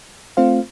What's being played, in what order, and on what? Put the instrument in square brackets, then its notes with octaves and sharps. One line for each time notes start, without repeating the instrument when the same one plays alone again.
[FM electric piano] A3 C4 F4 C5 F5